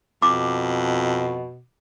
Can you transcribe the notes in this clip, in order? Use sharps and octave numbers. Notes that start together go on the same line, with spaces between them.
F2 B2 D6